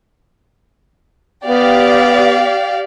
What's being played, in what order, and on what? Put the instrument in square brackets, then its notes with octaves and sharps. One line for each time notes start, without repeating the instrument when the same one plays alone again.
[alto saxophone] B3 [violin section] G4 D5 F5